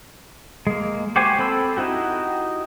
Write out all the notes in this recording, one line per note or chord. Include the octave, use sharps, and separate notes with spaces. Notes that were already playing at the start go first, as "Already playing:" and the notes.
G#3 A#3
F#4 G4 C5 G#5
C4 A4 B5 E6
D#4 E4 F#4 G4